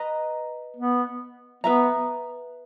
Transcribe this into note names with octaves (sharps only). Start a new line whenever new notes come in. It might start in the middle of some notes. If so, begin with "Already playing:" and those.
Already playing: B4 D#5 A#5
B3
B3 B4 E5 A#5